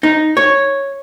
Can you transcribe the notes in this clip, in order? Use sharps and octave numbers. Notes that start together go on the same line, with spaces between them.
D#4
C#5